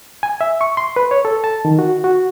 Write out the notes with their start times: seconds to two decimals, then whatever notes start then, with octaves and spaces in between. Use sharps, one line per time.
0.23 G#5
0.41 E5
0.61 C#6
0.77 C6
0.96 B4
1.11 C#5
1.25 A4
1.44 A5
1.65 D#3
1.79 F#4
2.04 F#4